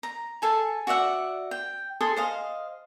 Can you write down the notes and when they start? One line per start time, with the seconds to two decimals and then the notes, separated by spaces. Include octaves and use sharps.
0.03 A#5
0.42 G#4 A4 G#5 A5
0.87 F#4 D5 E5 F#5
1.51 G5
2.01 G#4 A4 C6 D#6
2.16 C5 D#5 F5